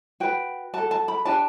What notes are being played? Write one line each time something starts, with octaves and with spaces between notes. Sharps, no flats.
F#4 B4 G5
F#4 A4 A5
A5
B5
D4 G4 B4 A5